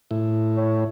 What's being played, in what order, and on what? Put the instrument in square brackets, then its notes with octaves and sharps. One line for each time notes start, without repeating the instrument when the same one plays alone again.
[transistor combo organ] A2 E4
[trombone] C#5